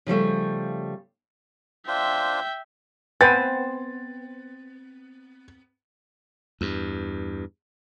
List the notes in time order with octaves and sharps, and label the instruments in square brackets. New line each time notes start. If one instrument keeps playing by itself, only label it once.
[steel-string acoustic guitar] C#3 F3 G3 A3
[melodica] D4 F4 C5 [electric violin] E5 G5
[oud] B3 C4 [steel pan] B4 G5 G#5 [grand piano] A6
[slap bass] E2 G2